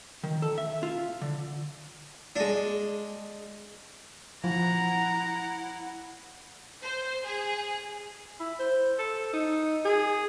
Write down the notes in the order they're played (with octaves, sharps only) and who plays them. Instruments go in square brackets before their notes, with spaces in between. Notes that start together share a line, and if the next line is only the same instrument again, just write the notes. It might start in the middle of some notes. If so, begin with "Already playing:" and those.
[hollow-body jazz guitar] D#3
A4
E5
F4
D3
[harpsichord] G#3 D4
[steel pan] F3 [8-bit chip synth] E4 [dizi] F#5 [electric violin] A#5
[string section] C5
G#4
[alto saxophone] E4
C5
A4
D#4
G#4